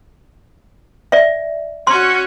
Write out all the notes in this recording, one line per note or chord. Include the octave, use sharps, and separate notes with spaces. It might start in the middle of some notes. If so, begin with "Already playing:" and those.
D5 E5
C#4 F#4 C6